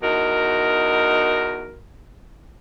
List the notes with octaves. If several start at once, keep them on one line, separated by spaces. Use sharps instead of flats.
E2 D#4 F#4 A#4